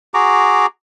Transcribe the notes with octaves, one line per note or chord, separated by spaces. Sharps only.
F#4 G#4 A#5 D6